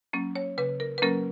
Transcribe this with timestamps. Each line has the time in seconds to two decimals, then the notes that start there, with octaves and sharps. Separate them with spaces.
0.13 F#3 A#3 C#4
0.36 C#5
0.58 C#3 B4
0.80 A#4
0.98 B4
1.02 F#3 A#3 C#4 A#4